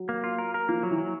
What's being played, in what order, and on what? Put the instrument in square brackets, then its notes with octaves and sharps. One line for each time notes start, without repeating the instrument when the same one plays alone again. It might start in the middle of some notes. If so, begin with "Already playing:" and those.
Already playing: [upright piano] F#3
[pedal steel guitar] A#3
F4
A#4
A#4
[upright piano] F3 [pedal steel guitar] A#3
[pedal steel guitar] F#3
[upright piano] E3
[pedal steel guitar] F#3